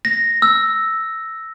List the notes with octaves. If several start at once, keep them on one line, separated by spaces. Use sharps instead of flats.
A#6
E6